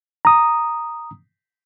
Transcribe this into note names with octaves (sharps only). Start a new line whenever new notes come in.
A#5 D#6